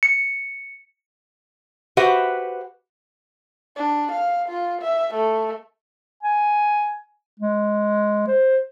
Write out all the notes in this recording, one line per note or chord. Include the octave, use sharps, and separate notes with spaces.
C#7
F#4 G4 B4 C5 E5 F#5
D4
F5
F4
E5
A3
G#5
G#3
C5